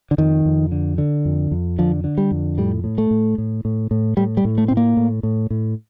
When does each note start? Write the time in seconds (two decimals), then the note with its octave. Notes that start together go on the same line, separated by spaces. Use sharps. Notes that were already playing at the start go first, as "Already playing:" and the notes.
0.11 D3
0.18 F2 D#3
0.46 F2
0.72 D3
0.98 D3
1.25 F2
1.51 F2
1.78 D3 F3
2.04 D3
2.18 G3
2.31 F2
2.58 A2 G3
2.84 A2
2.98 A3
3.11 A2
3.38 A2
3.65 A2
3.91 A2
4.17 A2 G3
4.37 G3
4.45 A2
4.58 A3
4.68 A2 C4
4.77 A#3
4.97 A2
5.23 A2
5.50 A2